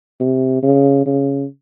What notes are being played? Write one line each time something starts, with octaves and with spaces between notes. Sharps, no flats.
C3
C#3
C#3